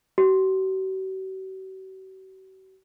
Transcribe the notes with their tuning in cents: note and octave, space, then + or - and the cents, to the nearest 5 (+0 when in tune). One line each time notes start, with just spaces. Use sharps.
F#4 +45